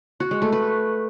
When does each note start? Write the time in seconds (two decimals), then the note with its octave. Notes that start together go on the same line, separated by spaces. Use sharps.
0.20 F#4
0.31 G#3
0.42 A3
0.52 B4